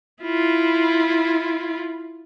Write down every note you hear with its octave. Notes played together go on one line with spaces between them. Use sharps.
E4 F4